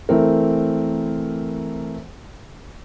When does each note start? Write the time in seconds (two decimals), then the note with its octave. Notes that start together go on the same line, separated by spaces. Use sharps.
0.09 E3 A3 C4 A#4